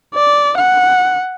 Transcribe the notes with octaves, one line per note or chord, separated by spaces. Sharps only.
D5
F#5